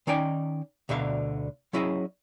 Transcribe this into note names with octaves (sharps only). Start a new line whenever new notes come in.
D#3 C#4 D#4 D5 G5
D2 B2 D3 E5 F5
F#3 C#4 E4 G#4 D#5